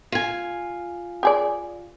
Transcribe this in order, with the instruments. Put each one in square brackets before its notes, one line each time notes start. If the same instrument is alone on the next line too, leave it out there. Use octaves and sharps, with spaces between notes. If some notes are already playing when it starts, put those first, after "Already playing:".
[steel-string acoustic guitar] F4 G#5
[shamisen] G4 G#4 D5